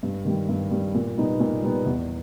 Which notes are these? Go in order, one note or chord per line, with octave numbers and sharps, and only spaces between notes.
G2
D#3 G3
G2
D#3 G3
A#2
G3 B3 D#4
A#2
G3 B3 D#4
E2